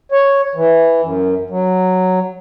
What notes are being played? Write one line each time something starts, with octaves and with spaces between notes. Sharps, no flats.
C#5
E3
F#2
F#3